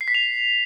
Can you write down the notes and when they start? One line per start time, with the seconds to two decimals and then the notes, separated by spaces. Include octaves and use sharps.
0.01 C7
0.08 B6
0.15 F7